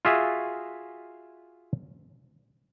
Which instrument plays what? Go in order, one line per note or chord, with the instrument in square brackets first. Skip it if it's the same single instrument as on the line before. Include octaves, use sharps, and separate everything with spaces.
[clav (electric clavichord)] F4 F#4 G#4 E5